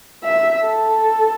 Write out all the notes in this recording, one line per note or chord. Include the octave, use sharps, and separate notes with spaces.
E5
A4